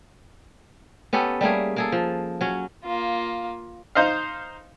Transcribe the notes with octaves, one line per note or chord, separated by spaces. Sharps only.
B3 C#4 G4 A4
G3 A3 A#3 G#4
A#3 G#4 A4
F3
F#3 C#4
A#3 F4
D#4 C5 D#5 F5